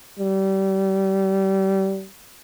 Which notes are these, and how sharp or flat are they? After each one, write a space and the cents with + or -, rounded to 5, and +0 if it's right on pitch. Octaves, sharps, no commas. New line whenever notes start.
G3 -25